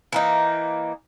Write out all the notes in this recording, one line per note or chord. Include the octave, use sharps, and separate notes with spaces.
E3 A#3 D#4